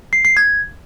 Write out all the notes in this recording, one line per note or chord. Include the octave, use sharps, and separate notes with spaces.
C7
C7
G#6